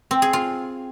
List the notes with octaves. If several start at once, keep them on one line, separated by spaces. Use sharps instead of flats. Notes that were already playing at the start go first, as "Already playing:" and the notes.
C4
G#4
F4